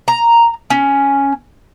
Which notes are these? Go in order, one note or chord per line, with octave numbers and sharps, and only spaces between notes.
A#5
C#4